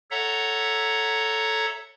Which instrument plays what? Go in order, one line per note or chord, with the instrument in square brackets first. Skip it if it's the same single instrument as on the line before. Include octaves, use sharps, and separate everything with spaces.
[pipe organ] A4 C#5 E5 F#5 A#5